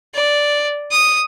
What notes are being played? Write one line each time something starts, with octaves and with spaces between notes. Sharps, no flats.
D5
D#6